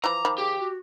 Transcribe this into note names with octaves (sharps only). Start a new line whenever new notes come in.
E3 F3 A#5 B5 D6
D#3 F3 B5
G4 G#4
F#4